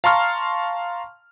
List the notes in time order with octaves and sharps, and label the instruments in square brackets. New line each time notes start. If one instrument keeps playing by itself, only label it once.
[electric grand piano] F5 A5 A#5 C6 C#6 F6